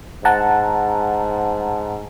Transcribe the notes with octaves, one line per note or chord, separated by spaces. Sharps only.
G#2 F#5 A5 A#5